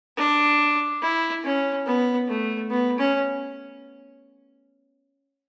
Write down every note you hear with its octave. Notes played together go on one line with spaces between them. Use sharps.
D4
E4
C#4
B3
A3
B3
C#4